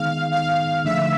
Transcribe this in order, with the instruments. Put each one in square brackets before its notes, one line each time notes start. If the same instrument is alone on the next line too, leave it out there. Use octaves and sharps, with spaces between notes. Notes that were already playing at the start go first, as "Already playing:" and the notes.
Already playing: [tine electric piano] D#3 G#3 B3 D#4 G#4 [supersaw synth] F5
[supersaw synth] F5
[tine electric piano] D3 F3 A3 D4 [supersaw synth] E5